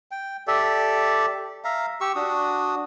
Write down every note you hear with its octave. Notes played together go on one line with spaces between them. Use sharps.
G5
G4 A4 D5 E5
E5 F5 A#5
G4 C#6 E6
D4 F#4 D#6